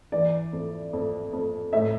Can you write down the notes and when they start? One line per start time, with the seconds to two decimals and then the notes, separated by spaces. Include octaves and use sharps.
0.12 E3 D5
0.53 F2
0.93 F2
1.33 F2
1.73 A2 E5